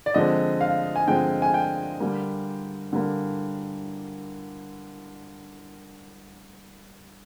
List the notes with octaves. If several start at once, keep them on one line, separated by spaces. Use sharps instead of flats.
D5
D3 F3 G#3 C4 D#5
F5
G#5
D3 F3 G#3 C4 G5
G#5
G5
D3 G3 A#3
D3 G3 A#3